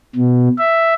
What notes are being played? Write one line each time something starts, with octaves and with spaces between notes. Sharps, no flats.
B2
E5